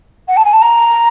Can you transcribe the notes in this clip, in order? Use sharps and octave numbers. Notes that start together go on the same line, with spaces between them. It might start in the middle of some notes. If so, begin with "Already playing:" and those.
F#5
A5
G#5
A5
A#5